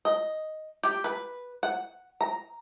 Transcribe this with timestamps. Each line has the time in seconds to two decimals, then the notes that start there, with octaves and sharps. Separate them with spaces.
0.05 D#5
0.83 G4
1.04 B4
1.63 F#5
2.21 A#5